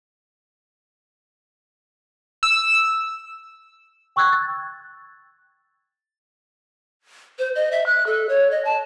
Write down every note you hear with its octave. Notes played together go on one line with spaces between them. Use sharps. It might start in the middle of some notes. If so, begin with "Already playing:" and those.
E6
G5 C#6 E6 F#6 G#6
A6
C5
D#5
E5
F#6
A4
C#5
D#5
A5